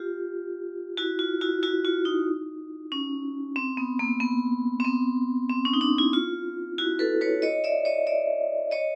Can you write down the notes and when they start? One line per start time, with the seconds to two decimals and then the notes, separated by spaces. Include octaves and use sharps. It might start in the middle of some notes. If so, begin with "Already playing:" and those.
Already playing: F4 G4
0.97 E4 F#4
1.19 F4
1.41 E4 F#4
1.63 E4 F#4
1.85 F4
2.05 D#4
2.92 C#4
3.56 C4
3.77 B3
3.99 A#3
4.20 B3
4.80 C4
4.85 B3
5.49 C4
5.65 C#4
5.74 D#4
5.81 D4
5.98 E4
6.13 F4
6.78 E4 F#4
6.99 A4 B4
7.21 B4 C#5
7.42 C#5 D#5
7.64 D5 E5
7.85 C#5 D#5
8.07 D5 E5
8.71 C#5 D#5